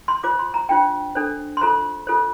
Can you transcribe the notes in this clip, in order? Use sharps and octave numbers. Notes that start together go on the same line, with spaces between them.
C6
F4 C5 D6
C6
A#5
D4 F4 C5 G5
D4 A4 C5
C6
F4 A4 C5 A#5
F4 A4 C5